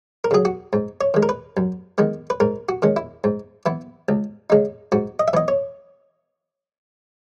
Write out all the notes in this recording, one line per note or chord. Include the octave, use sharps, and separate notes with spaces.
A#4
C#3 F#3 G#4
F#4
G#2
C#5
D#3 G#3
A#4
B4
F#2
D#3 G#3 B3
B4
G#2 A#4
F#4
D#3 G#3 C#4
E4
G#2
E3 B3 E4
C#2
C#3 G#3 D#4
G#2 F#4
D#5
E5
E3 B3 D#5
C#5